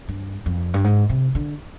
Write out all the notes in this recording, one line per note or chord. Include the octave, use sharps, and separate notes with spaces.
G2
F2
G2
G#2
C3
D3